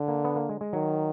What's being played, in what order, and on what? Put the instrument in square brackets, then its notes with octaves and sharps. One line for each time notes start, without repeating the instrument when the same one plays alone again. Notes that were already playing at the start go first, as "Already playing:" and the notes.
Already playing: [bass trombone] D3
[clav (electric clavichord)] A#3
B3
A#3
G#3
G#3
[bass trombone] D#3 [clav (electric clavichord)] F#3